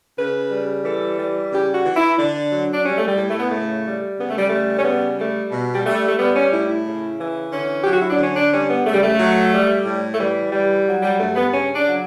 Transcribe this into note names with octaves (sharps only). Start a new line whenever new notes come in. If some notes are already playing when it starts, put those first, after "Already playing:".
C#3 B4
G3
E3 A4
G3
C#3 G4
F#4
E3
E4
D3 D4
F#3
D4
G3 C#4
A3
G3
A2
A3
B3
C#3 A3
G3
C#3 B3
A3
G3
G3 A3
C#4
C#3 B3
G3 A3
B2
G3
G3 A3
A3
G3 B3
C#4
A2 E4
E4
C#3
E3
D3 C#4
F#3 G4
F#4
E4
D4
D3 C#4
D4
G3 C#4
B3
C#3 A3
G3
A3
F#3
G3
A2
A3
E3 G3
G3
F#3
G3
G2 A3
B3
C#3 C#4
D4
F#3